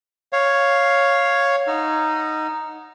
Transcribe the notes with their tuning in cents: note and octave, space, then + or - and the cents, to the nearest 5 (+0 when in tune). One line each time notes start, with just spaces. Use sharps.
C#5 +0 F5 +5
D#4 +0 F#5 -15 E6 +45